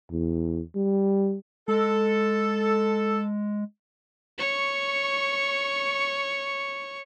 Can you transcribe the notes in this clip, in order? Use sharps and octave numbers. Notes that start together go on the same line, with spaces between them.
E2
G3
G#3 A4
C#5 C#6